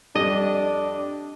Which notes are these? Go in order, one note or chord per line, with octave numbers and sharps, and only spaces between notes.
F2 G3 D4 D#5